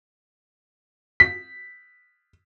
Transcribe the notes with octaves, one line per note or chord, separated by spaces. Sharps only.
B6